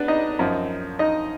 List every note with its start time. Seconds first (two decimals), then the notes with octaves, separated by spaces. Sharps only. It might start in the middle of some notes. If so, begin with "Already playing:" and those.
Already playing: B3 D4 B4 D5
0.08 D#4 D#5
0.39 F#2 F3
0.99 D#4 D#5